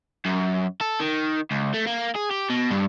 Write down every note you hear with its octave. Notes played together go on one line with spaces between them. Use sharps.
F#2
A4
D#3
C#2
A3
A#3
G#4
G4
B2
G2